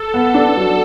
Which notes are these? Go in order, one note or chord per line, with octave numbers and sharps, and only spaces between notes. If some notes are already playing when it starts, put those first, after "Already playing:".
Already playing: A4
B3
D4
F#3